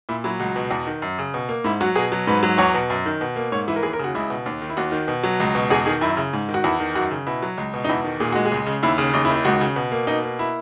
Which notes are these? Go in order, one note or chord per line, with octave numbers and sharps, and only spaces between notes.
A#2 E4
F#3 E4
C#2 F#4
B2
E2
D#3
F#2
C#3
B2
A#3
G#2 E4
F#3 F#4
B2 G#4
F#3
G#2 B4
F#3
E2 C#5
B2
F#2
D#3
B2
A#3
G#2 C#5
E3 E4
A#4
D#2 G#4
A#4
C#3 F#4
C#2 E4
B2
D#2
D#3
E4
D#2 F#4
D#3
B2
F#3
C#2
B2
E2 G#4
D#3 G#4
F#2 E4
C#3
G#2
D#3
F#4
E2 E4
D#3
F#2 F#4
C#3
B2 E4
F#3
C#2
B2
D#4
E2 E4
D#3
A#2 G#4
G#3 F#4
G#4
C#2
C#3
D#2 E4
C#3
D#2 D#4
E4
D#3
E4
C#2 F#4
C#3
B2
A#3
B2 D#4
A#3
E4